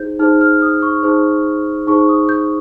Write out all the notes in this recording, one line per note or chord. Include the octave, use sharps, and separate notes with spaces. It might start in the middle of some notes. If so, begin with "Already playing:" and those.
Already playing: D#4 G#4 C5 G6
D#4 G#4 C5 F6
F6
D#6
C#6
D#4 G#4 C5
D#4 G#4 C5 C#6
D#6
G6